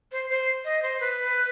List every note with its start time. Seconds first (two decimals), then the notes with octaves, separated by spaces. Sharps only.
0.12 C5
0.30 C5
0.65 D#5
0.82 C5
1.00 B4